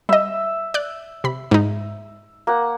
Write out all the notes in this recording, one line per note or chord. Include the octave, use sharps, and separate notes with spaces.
G3 D#5 E5
D5 F#6
C3 B5
G#2 D#4
A#3 F#5